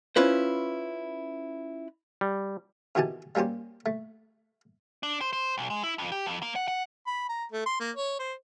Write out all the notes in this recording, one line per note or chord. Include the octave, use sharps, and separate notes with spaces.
C#4 E4 F4 B4 C5
G3
B2 D#3 E3 G4 G#4 A5
G3 A#3 C#4 G4 C5
A3
D4
C5
C5
B1
G#3
E4
F2
G4
F2
A#3
F#5
F#5
B5
A#5
A3
C6
A#3
C#5
C5